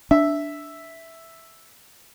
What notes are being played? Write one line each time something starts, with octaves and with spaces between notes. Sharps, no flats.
D4 E5